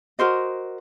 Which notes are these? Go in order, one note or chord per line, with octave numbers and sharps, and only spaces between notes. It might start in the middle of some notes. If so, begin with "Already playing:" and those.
F#4 A#4 C5 D#5